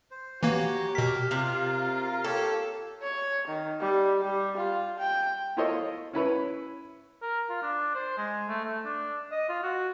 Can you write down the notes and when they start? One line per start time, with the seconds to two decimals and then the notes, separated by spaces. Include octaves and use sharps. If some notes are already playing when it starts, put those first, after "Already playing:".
0.11 C5
0.43 E3 A#3 F#4 G4 C#5 A#5
0.95 B2 A#4 B6
1.31 C3 F4
2.24 A#3 G4 A4 C#5
3.02 C#5
3.48 D#3
3.81 G3
4.21 G3
4.57 F4
4.99 G5
5.57 E4 F4 A4 C5 C#5 D#5
6.13 C#4 E4 B4 C#5
7.22 A#4
7.49 F4
7.62 D4
7.95 C5
8.17 G#3
8.48 A3
8.65 A3
8.85 D4
9.31 D#5
9.49 F4
9.63 F#4